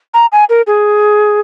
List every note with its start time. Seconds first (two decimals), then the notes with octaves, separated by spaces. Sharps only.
0.14 A#5
0.32 G#5
0.49 A#4
0.67 G#4